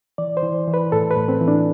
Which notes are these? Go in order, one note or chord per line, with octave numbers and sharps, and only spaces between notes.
E3 D5
C5
E3
E3
B4
A2 A4
B4
A2
C4
E3
D4